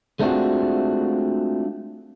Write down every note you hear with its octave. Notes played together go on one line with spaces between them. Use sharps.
G#3 A3 C4 D4 F4 F#4